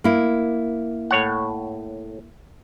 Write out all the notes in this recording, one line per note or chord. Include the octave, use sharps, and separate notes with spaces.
A#3 E4
A2 C#5 F#5